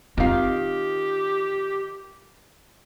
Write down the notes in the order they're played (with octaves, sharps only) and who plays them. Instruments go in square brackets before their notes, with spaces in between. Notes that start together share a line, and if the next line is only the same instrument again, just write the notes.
[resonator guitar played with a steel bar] D#3 F5 [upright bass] C4 F4 [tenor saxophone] G4